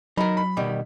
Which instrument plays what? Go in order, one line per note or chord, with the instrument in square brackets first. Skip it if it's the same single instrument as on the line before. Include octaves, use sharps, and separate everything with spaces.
[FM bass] F#3 [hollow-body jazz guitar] D#4 A#4 [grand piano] B5
[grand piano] B5
[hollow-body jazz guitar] B2 D#3 G3